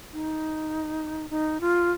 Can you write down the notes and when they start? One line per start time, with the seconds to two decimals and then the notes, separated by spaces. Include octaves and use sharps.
0.13 D#4
1.30 D#4
1.61 F4